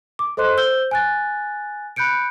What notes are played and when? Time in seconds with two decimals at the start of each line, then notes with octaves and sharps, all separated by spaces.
0.19 D6
0.37 A4 C5 D#5 C6 F#6
0.57 C5 E6 G6 G7
0.91 G#5 F#6 A6
1.96 B5 F#6 G6 C#7 D7